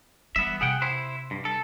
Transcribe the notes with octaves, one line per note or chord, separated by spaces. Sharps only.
E3 G3 B3 E5
C3 G#4 F#5 G5
E4 C5 E5
G2
A4